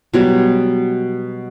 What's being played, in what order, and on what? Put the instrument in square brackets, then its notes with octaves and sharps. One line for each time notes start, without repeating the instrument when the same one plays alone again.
[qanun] B2 F#3 G3